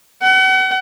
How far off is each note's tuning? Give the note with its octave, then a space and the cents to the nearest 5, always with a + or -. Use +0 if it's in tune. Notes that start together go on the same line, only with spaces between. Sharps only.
F#5 +35